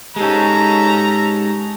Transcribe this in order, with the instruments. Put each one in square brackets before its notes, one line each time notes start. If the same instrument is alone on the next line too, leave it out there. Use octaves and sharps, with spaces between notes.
[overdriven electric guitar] G#3 D#4 [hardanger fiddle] C#4 A4 [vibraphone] G4 [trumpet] A#5